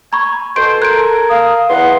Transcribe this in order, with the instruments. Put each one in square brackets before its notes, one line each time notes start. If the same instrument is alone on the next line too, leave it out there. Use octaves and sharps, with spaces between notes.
[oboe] G#5 [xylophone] A#5 B5 C#6
[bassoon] B2 [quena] A4 [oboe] C5 [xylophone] C6 D7
[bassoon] A#4 [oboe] G#5 [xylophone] F#6 D7
[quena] F5 [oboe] D#6
[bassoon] E2 [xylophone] B4 [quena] F#5 [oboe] C6